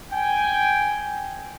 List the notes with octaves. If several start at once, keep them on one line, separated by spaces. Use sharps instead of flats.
G5 G#5